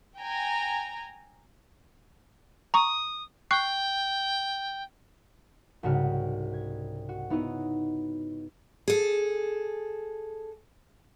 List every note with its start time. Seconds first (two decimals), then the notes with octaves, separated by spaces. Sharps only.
0.18 G5 G#5 A#5
2.74 A#5 C#6 D#6
3.51 G5 C#6 F#6 C7
5.83 C2 G#2 C#3 F#4 A5 F6
6.54 G#6
7.09 F#4
7.30 B3 D#4 E4 C#5 D#5
8.88 G#4 A4